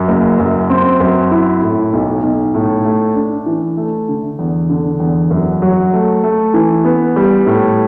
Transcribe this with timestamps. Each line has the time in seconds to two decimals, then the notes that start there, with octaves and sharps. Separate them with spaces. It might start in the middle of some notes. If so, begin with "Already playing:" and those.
Already playing: F#2
0.08 F#1
0.39 F#2
0.70 C4
1.00 F#2
1.31 E4
1.62 A2
1.93 B1
2.23 B1
2.55 A2
2.85 A3
3.16 D4
3.46 E3
3.77 A3
4.08 D3
4.39 E2
4.69 D3
5.00 E2
5.31 F#2
5.62 F#3
5.93 A3
6.24 A3
6.54 E3
6.85 B3
7.16 G3
7.46 A2